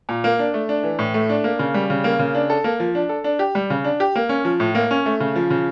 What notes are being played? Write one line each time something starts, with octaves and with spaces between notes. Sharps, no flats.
A#2
A#3
D4
A3
D4
E3
A2
A3
D4
A#3
C#3
G3
C#3
A#3
C#3
D4
A4
A#3
F3
D4
A4
D4
G4
G3
C#3
D4
G4
A#3
C#4
F3
A2
A#3
C#4
A3
C#3
F3
C#3